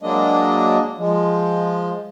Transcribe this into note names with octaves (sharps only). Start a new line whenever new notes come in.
F#3 G#3 A#3 D4 D#5
F3 G#3